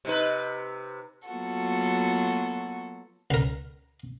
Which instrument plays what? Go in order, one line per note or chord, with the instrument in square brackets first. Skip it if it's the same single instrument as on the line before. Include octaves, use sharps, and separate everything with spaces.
[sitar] C3 D#4 B4
[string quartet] F#3 A#3 B3 F4 F#4 A4
[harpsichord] C#2 A#4